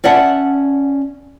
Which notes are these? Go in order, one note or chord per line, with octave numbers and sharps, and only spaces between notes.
C#4 D5 E5 F#5 A5